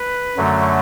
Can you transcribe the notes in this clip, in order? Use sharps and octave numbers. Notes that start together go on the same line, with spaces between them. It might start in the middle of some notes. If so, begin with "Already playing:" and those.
Already playing: B4
F#2 D3 F#3 A3